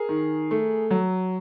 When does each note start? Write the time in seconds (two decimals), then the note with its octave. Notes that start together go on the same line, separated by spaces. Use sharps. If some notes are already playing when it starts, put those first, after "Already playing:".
Already playing: G#4 A#4
0.09 D#3
0.51 A3
0.91 F#3